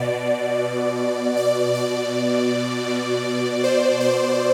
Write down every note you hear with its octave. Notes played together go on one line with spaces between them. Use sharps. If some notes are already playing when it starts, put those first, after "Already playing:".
Already playing: B2 D5
D5
D5
B2
C5
C5